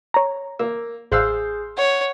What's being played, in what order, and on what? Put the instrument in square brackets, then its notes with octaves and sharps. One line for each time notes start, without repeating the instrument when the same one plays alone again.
[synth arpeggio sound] C#5 A#5
[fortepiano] A#3 [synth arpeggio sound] E6
[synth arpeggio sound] A1 F#6 C7 [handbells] G#4 [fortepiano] C5 F5 E6
[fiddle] C#5 [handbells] F#5